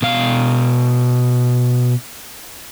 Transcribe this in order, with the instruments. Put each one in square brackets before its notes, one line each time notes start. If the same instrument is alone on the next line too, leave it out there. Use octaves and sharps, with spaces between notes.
[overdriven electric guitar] B2 F5